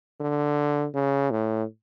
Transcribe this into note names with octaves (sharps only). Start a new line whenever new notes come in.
D3
C#3
A2